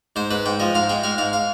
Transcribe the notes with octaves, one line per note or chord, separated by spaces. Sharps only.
G#2 C5
G#2 B4
G#2 G5
F3 D#5
G#2 F5
G#3 G5
G#3 F5
G#2 F5
F5